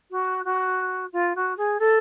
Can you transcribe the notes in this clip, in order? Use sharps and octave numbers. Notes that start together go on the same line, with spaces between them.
F#4
F#4
F4
F#4
G#4
A4